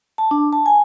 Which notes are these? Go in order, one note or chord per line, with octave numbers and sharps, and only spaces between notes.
A5
D4
A5
G#5